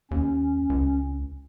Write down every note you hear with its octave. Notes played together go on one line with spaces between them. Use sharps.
D#2 C#4
C#2